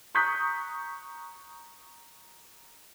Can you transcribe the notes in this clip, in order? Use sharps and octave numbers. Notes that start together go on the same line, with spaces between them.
A#5 C#6 D#6 F#6 G6 B6